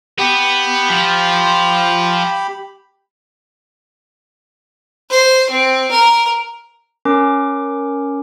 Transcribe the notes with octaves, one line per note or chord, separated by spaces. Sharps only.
B3 G4 B5
F3
C5
C4
A#4
C#4 A#4 D6